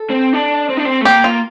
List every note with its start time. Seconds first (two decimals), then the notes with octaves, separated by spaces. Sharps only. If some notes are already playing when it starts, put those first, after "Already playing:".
Already playing: A4
0.10 C4
0.33 D4
0.69 C4
0.77 D4
0.85 C4
1.01 A3
1.05 A#3 G4
1.24 F4